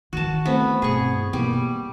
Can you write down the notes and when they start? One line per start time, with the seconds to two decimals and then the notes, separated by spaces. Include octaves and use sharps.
0.13 D#3 E3 F#4 A5
0.45 A3 B3 C4 E4
0.82 G2 B2 G#4 C#6
1.33 B2 E3 G3 A#3 B3